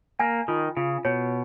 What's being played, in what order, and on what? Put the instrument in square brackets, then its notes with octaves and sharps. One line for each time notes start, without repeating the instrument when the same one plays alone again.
[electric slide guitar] A#3 [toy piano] G#5
[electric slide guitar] D#3 [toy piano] F4
[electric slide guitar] C#3 [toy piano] F4
[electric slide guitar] B2 [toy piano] C#5